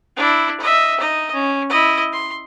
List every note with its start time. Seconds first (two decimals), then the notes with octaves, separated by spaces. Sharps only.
0.17 D4 E4
0.60 D#5 E5
1.00 D#4 D#5
1.34 C#4
1.69 E4 D#5
2.12 C6